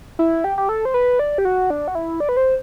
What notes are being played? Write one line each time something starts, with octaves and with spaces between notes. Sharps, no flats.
E4
G4
G4
A4
C5
B4
D5
G4
F#4
D4
F#4
E4
D5
B4
C5